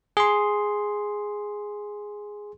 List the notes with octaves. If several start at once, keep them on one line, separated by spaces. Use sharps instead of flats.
G#4 C6